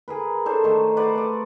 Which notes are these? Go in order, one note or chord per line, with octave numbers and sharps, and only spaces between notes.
G#4 A#4 B4
D4 A4 C5 C#5
D#3 A3
B4 C5 D5 F#5
D5 C#6